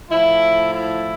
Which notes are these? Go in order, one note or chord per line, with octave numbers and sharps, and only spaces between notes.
A2 F3 E4
E4